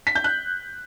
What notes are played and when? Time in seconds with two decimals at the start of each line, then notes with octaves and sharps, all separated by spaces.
0.07 B6
0.15 G6
0.24 F#6